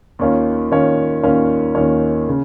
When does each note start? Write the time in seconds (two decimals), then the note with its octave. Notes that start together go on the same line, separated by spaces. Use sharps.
0.19 D#2 D#3 C#4 F4 C#5
0.71 D#2 D#3 C#4 F4 C#5
1.23 D#2 D#3 C#4 F4 C#5
1.75 D#2 D#3 C#4 F4 C#5
2.29 C#3